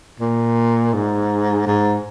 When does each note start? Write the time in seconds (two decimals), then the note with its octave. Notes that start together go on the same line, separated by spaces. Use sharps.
0.20 A#2
0.93 G#2
1.67 G#2